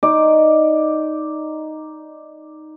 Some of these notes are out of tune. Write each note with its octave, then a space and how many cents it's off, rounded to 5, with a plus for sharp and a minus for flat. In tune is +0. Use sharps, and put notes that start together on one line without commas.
D#4 +0 D5 +0